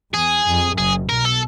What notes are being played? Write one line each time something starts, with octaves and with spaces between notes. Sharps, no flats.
E2 G#4
F2
F#1 F#2 G#4
B1 B2 A#4
A4